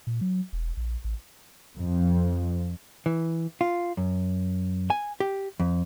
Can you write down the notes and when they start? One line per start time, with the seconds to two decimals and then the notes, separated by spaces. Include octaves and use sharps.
0.07 A#2
0.21 F#3
0.53 E1
0.77 A#1
1.04 A1
1.78 F2
3.06 E3
3.61 F4
3.97 F#2
4.90 G#5
5.20 G4
5.60 F2